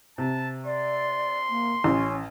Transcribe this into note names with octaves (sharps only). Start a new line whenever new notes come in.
C3 A5
D5 C6
A#3
A1 C#4